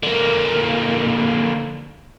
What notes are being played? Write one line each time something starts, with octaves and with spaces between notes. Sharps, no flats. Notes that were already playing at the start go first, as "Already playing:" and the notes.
D3 A#3